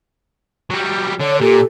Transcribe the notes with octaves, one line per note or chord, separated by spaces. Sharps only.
F#3 G3
D3 C#5
A#2 G4 A4